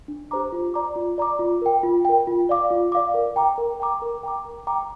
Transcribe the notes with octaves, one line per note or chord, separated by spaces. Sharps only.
D4
G4 C5 A#5 D6
F4
D5 A#5 D6
F4
D5 A#5 D6
F4
A#4 G5
F4
A#4 G5
F4
D5 F5 D6
F4
D5 F5 D6
A#4
G5 A#5 D6
A#4
G5 A#5 D6
A#4
G5 A#5 D6
A#4
G5 A#5 D6